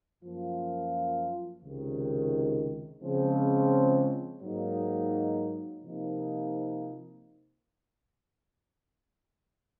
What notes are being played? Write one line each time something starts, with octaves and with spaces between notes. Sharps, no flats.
F#2 F3 A#3 F4
C#2 C3 D#3
C#3 F3 G#3 C4
G#2 F#3 A#3 D#4
C3 F3 A#3 D#4